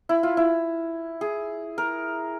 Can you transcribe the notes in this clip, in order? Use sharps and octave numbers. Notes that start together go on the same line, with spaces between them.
E4
F4
E4
G#4
A#4